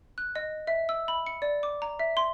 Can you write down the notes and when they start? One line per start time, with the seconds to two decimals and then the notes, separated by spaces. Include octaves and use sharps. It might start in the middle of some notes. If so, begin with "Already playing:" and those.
0.18 F#6
0.36 D#5
0.67 E5
0.89 E6
1.08 B5
1.26 C#7
1.42 D5
1.63 D6
1.82 A#5
1.99 E5
2.17 C6